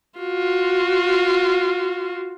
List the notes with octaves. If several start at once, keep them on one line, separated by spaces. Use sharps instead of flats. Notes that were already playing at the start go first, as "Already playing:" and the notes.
F4 F#4